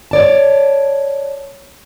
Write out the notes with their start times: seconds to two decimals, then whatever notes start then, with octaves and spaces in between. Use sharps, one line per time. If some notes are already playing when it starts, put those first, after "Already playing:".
0.11 C#5 D5 A5